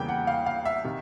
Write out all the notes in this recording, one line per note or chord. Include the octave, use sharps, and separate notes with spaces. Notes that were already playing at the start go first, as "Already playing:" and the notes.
Already playing: E2 C#3 E3 G3 A#3 G5
F#5
F5
F5
E5
C3 D#3